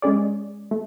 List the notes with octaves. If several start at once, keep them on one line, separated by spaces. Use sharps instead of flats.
G#3 C#4 G#4 D5
A3